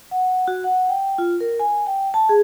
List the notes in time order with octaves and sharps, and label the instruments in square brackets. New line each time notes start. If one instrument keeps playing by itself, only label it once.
[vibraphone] F#5
F#4
F#5
G5
F4
A#4
G#5
G5
A5
G#4